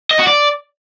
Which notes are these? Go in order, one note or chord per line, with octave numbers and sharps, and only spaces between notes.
D#5
F#4
D5